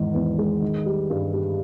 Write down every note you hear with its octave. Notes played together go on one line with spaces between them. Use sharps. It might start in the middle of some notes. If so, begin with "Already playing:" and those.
Already playing: E2 G#2 D#3
E2
G#3
D#3
G3
G2
G3